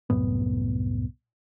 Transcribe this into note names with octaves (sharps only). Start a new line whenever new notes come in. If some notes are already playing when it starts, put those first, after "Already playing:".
C2 F#2 A2 B3